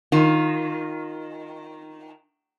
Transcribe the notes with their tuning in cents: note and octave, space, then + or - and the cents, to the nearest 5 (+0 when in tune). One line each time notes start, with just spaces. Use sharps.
D#3 +0 F4 +15